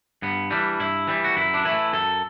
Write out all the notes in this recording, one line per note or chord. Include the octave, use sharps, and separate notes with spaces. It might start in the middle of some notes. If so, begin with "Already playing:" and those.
G2 B3
E3 G3 D4
G2 E4
E3 G3
F#4
F#2 E4
D4
E3 A3 E4
F#2 A4